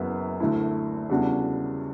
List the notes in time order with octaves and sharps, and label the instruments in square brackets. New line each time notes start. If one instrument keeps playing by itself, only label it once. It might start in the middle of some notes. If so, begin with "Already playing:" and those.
Already playing: [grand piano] F#1 F#2 E3 B3 E4
D2 D3 A3 E4
E2 C#3 G3 D4 F#4